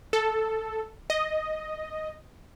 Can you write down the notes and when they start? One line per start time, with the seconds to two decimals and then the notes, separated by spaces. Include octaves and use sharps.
0.13 A4
1.10 D#5